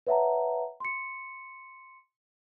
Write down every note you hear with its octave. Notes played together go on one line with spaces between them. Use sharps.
B4 C#5 E5 F#5 A5 A#5
C6 C#7